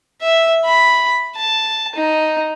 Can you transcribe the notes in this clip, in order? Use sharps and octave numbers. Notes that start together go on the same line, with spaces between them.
E5
B5
A5
D#4